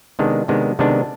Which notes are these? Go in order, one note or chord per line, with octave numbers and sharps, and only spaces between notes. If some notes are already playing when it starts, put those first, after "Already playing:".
C3 D#3 G#3 B3 D4
C3 D#3 G#3 B3 D4
C3 D#3 G#3 B3 D4